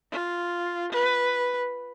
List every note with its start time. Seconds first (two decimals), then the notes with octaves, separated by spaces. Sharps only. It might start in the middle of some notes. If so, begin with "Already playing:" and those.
0.12 F4
0.92 B4